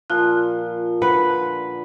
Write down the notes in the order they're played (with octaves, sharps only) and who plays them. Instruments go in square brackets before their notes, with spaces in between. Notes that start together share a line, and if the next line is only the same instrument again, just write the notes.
[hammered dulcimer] A#2 F3 [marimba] F4 F#6
[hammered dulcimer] D3 [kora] B4